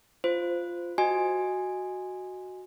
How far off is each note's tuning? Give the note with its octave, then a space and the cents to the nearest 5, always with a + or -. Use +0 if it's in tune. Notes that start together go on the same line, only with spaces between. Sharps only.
F4 -5 C5 -15
F#4 +0 D#5 +0 G#5 -5